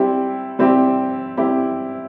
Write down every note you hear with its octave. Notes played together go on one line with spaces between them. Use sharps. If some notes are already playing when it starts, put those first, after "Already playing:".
Already playing: G3 C4 E4 G4
G3 C4 E4 G4
G3 C4 E4 G4